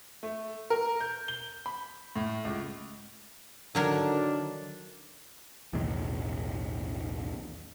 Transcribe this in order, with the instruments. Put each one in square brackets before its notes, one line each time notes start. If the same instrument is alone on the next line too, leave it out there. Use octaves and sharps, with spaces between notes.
[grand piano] A3
A#4
G6
G7
B5
A2
C#2
[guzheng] D3 F#3 A#4 [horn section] D#3 D4
[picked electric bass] B1 E2 A2 D#3